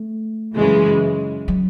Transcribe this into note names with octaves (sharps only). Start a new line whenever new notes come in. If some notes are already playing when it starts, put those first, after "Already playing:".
Already playing: A3
F#2 C#3 E3 G#3
F#3